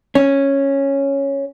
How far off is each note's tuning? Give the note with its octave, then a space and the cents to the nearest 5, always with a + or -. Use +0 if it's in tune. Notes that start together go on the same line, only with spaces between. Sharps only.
C#4 -5